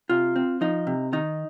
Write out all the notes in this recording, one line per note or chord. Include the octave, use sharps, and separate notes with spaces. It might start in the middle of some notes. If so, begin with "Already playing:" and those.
C3 F4
C4
F3 D#4
C3
D#3 D#4